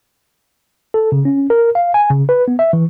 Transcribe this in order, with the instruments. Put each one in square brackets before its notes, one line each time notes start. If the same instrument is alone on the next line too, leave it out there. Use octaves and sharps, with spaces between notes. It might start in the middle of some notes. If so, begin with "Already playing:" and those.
[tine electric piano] A4
C#3
C#4
A#4
F5
G#5
C#3
B4
B3
E5
E3